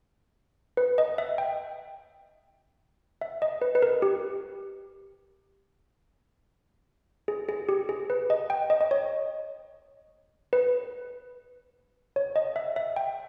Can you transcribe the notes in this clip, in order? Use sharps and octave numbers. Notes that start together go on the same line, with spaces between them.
B4
D#5
E5
G5
E5
D#5
B4
B4
A#4
G4
G#4
G#4
G4
G#4
B4
D#5
G5
D#5
D#5
C#5
B4
C#5
D#5
E5
E5
G5